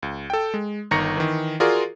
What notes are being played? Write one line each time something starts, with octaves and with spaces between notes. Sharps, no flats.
C#2
A4 G5
G#3
G1 D#3 A#5 C#6 A#6 C#7
D#3 E3
F4 F#4 G#4 A#4 D5